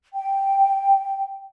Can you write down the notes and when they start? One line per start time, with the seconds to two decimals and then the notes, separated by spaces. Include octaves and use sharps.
0.13 G5